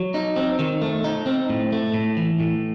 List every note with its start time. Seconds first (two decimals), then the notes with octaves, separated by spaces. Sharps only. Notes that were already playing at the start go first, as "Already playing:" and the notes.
Already playing: F#3
0.14 D#4
0.36 C4
0.59 D#3
0.82 A3
1.04 D#4
1.26 C4
1.49 A2
1.72 A3
1.94 A2
2.17 E3
2.40 A2